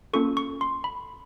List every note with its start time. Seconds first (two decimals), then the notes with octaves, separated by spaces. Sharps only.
0.13 A#3 C#4 F4 A4 C#6
0.37 C#6
0.61 C6
0.84 B5